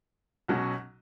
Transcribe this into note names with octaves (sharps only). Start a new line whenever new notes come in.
B1 B2 F#3 C#4 F#4